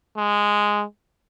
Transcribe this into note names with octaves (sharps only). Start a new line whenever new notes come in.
G#3